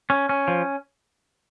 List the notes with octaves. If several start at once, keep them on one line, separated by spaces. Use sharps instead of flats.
C#4
C#4
F3